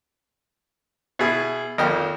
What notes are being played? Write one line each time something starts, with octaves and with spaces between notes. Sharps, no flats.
B2 E4 G#4
G#1 F2 A#3 D#5 G5 F6